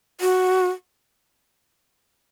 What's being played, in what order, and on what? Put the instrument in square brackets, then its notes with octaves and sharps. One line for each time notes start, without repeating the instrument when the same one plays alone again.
[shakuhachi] F#4